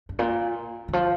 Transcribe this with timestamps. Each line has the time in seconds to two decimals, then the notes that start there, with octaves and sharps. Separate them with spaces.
0.09 G2
0.19 A#2
0.88 D3
0.93 F3